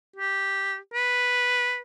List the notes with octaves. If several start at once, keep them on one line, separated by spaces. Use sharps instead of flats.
G4
B4